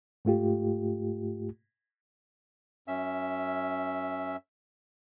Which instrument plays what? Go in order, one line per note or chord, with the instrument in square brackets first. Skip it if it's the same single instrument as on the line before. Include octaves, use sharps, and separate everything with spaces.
[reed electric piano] G#2 A3 F4 G4
[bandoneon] F#2 C#4 E5 E6